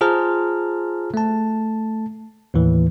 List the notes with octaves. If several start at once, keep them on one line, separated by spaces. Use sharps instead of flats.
F4 G#4 C5 A5 A#5 F6
A3 A5
D#2 A2 E3